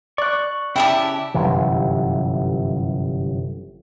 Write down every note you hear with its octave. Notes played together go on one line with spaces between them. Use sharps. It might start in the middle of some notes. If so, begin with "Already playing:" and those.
D5 C#6 F#6
C#3 E4 G4 E5 G5 A5 D6
G1 F#2 C3 E3